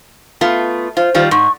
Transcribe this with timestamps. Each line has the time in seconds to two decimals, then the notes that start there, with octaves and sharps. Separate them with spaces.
0.41 A3 B3 F4
0.97 F4 C5
1.14 D#3 G3 F4
1.31 G#2 C#6